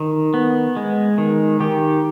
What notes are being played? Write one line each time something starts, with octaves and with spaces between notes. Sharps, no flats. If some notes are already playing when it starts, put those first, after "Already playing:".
Already playing: D#3
B3
G#3
D#3
D#3 G4